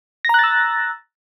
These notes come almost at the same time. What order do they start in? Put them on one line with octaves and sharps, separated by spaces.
A#6 A#5 F#6 A6 E6